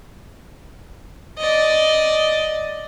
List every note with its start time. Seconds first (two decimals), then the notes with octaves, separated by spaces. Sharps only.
1.38 D5 D#5